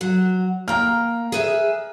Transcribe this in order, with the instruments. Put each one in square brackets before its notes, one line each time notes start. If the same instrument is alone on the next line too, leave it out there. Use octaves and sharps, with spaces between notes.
[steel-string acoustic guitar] F#3 F#4
[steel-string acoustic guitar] A#3 G5 [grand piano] A#5 F6
[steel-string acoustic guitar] G#4 B4 E5